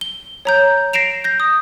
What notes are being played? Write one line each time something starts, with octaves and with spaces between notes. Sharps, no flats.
G7
C#5 A#5 G6
A#6 C7 D7 E7 F7
G6 A#6
D#6